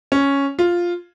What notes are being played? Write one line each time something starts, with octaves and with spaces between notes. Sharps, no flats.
C#4
F4